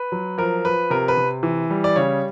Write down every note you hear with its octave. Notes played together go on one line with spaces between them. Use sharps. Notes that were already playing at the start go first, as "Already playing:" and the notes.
Already playing: B4
F#3
F3 A#4
F3 B4
C3 A#4
B4
C3
E3
G3
D5
C#3 C#5